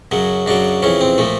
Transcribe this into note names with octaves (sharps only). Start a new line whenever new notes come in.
F#2 C#3 F#3
F#2 C#3 F#3 D4
F2 C#3 E3 C#4
C4
A#2 F3 A3